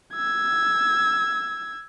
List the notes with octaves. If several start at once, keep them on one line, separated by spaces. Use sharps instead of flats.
E6 G#6